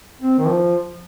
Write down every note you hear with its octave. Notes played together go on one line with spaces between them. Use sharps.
C4
D#3
F3